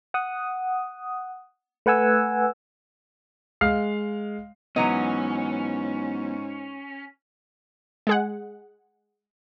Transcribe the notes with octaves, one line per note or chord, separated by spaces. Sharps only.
F#5 D#6
A3 B4 F#5 G#5 E6
G#3 F5 F6 C7
G#2 E3 F#3 B3 C#4 D#5
G#3 G#4 F#5